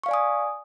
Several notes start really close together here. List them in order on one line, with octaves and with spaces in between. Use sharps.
C#6 F5 D5 G#5 D#6